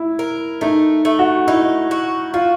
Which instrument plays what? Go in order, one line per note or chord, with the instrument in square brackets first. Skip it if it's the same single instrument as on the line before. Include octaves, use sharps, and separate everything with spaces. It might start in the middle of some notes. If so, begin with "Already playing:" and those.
Already playing: [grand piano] E4
[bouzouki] A#4
[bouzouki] A3 [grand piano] D#4
[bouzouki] A3
[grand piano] F#4
[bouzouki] D#4 [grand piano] E4
[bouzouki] F#4
[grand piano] F4 [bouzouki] F#4